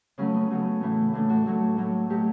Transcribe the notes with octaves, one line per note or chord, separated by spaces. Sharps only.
C#3 F#3 A3 C#4
B3
C#3 F#3 A3
A2 E3 A3
A2 E3 A3 D4
F#4
A2 F#3 A3
A2 F#3 A3
B2 F#3 A3 G4